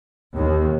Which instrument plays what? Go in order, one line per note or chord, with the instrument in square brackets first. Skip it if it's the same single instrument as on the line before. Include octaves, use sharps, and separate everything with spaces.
[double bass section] D#2